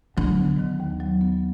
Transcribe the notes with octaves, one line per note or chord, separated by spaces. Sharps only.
D3 F#3
B3
D#3
D#2
F#3
B3